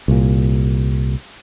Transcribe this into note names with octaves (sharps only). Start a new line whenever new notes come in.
C2 A#2